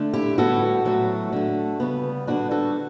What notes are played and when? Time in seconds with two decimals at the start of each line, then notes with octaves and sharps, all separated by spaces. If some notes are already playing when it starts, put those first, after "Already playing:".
Already playing: D3 A3
0.13 E4 G4
0.38 A2 G3 B3 F#4 A4
0.85 A2 F#3 A3
1.32 D3 A3
1.80 C#3 G3 B3
2.27 D3 G3 B3 D4 F#4
2.51 F#4 A4